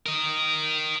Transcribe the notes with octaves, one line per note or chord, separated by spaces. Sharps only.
A#4 D#5